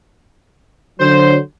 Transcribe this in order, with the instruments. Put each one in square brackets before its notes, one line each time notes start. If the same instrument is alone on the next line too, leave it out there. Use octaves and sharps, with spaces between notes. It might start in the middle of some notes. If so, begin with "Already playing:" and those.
[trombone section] D3 F#3 [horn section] C5